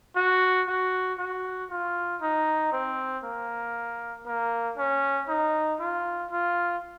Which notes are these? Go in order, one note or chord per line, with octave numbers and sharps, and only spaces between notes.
F#4
F#4
F#4
F4
D#4
C4
A#3
A#3
C#4
D#4
F4
F4